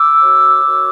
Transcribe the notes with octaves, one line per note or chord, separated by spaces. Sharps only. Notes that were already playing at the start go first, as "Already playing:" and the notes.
Already playing: D6 E6
F#4 A#4 C#5
F#4 A#4 C#5